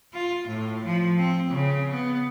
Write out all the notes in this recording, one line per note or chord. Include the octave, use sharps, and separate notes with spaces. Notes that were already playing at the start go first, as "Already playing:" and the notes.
F4
A2
F3
C4
C#3
B3